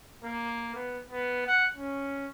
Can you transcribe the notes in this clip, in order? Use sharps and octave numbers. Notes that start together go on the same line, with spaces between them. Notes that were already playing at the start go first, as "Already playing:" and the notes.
A#3
B3
B3
F#5
C#4